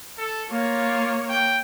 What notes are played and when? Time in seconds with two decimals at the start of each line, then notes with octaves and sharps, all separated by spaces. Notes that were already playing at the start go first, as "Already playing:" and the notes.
0.18 A4
0.51 A#3 F4 C#5
1.29 G5